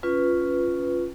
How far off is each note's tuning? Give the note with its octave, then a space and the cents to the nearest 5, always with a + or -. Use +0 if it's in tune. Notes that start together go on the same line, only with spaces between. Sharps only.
C#4 +5 F4 +0 B4 +5